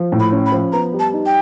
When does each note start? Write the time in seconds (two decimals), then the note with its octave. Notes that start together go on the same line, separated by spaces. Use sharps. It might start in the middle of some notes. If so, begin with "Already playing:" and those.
Already playing: F3
0.12 A2
0.20 B5
0.32 C#4
0.46 B5
0.52 F3
0.72 B3 A#5
0.93 G3
0.99 A5
1.13 D#4
1.26 G5